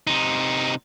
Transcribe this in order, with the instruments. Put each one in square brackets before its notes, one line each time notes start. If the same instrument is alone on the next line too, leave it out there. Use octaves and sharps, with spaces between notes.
[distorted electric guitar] C3 D#4